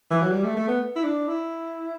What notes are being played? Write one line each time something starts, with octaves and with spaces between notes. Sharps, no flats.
E3
F#3
G3
A3
A3
B3
E4
D4
E4